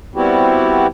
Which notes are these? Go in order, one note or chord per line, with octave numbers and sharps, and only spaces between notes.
G3 B3 C4 E4 F#4 G4